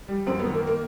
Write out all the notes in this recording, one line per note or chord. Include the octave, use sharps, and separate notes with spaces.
G3
F#2 C4
B3
D#3
A#3
A#3